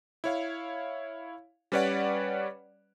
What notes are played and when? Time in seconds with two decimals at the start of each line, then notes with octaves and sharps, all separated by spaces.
0.24 E4 C#5 F5
1.72 G3 C#4 B4 C#5 D5 F#5